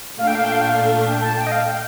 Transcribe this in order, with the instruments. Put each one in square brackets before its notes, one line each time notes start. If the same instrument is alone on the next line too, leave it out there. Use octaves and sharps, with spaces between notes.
[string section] A#2 A3 D4 [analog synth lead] F5
[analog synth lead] G5
F5
G5
F5
G5
F5
G5
A5
G5
D#5
F5
G5